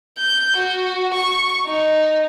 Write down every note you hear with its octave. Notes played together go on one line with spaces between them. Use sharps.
G6
F#4
C#6
D#4